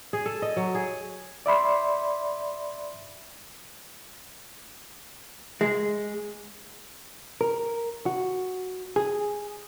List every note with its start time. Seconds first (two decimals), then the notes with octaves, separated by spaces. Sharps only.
0.13 G#4
0.26 A4
0.42 D#5
0.56 F#3
0.75 G#4
1.46 D5 E5 B5 C6
5.61 G#3
7.41 A#4
8.06 F#4
8.96 G#4